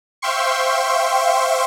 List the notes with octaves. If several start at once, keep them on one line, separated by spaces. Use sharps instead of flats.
C5 E5 F5 G5 C6 C#6